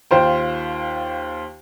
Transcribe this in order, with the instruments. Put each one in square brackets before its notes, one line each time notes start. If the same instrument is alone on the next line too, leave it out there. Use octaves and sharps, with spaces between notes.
[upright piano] D#2 F4 C5 G5